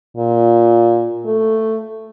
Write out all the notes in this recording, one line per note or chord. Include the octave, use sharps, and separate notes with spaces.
A#2
A3